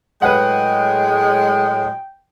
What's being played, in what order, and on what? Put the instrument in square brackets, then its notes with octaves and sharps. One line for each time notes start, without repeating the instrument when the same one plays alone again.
[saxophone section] A2 F#3 G#3 [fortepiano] B4 F#5 [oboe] G5